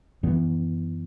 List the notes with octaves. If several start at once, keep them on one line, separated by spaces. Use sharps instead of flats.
F#2 E3 B3